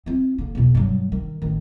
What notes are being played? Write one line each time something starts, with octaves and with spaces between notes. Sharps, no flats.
C4 E4
D3 A#3
E2 B2
G2 F#3
D#3
A1 D#3